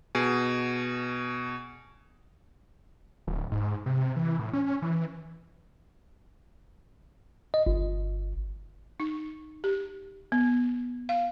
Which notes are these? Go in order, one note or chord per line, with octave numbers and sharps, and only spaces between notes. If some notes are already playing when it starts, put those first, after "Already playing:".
B2 G#4
D1
G#2
C3
E3
A2
C#4
E3
D#5
G1
D#4
G4
B3
F5